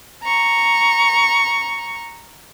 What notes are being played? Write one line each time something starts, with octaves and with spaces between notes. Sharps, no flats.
A#5 C#6